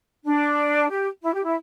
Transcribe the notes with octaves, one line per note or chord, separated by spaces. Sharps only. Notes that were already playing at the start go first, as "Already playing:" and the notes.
D4
G4
E4
G4
E4